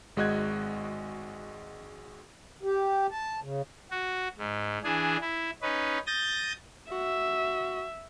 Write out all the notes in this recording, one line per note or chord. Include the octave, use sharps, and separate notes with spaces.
G#1 G#3 F#4 D#5 F#6 G#6
G4
A5
C#3
F#4
G#2
E3 D4 G#4
E4
C#4 D#4 B4
D#6 G6 A6 A#6
F#4 E5